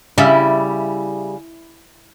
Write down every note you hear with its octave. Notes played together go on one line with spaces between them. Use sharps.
C#3 G3 E4